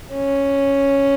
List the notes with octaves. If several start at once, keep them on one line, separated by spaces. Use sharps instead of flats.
C#4